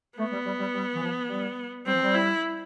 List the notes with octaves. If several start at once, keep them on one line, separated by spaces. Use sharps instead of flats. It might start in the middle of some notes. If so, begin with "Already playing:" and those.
A3 B3
G3
G3
G3
G3
E3
F3
G3
G3 C4
F3
G3
E4